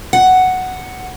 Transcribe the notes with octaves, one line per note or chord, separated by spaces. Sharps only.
F#5